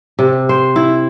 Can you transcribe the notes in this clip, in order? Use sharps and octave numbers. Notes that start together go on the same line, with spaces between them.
C3
C5
E4